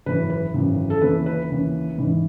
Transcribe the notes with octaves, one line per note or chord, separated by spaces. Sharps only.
G#1 F#2 C#3 E3 B4
B4
G#1 F#2 C#3 E3
A4
D#2 C#3 E3 B4
B4
D#2 C#3 E3
A1 G#2 E3